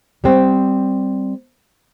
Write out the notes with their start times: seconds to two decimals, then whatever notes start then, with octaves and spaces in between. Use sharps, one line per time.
0.24 G3 C4